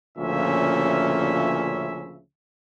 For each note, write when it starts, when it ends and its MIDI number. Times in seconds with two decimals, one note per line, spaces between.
0.17 2.20 38
0.17 2.20 46
0.17 2.20 49
0.17 2.20 53
0.17 2.20 61
0.17 2.20 76